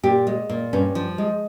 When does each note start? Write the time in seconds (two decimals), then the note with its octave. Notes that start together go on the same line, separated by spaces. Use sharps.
0.03 A#2 G4
0.27 G#3
0.49 A#2
0.73 G2 C#4
0.95 F3
1.18 G#3